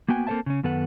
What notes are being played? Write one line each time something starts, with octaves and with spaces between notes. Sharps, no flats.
A#3 B3 F#4 G5 G#5
A#3 C4 A4 C5 E5 A5
C#3 C#4
F#2 D#3 B3 A4 B4 F#5